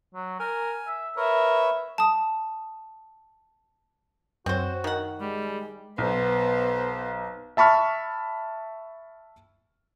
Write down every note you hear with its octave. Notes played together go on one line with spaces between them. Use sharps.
F#3
A#4 G#5
E5
A#4 B4 C#5 E5
A5 D#6
F#2 C4 F#4 C5 C#5
D#3 F#5
G3 G#3
B1 B3 C5
E5 A5 B5 C#6 F6